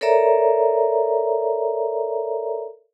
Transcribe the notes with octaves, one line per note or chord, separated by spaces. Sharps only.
A4 A#4 C#5 D5 E5 A#5